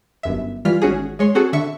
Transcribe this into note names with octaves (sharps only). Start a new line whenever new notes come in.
G1 F#2 E5
E3 G3 F4 F6 B6
G#1 C#4 F#4 G#4
G#3 C#5 C6
C4 F#4 G#4 A4
D3 E5 C#6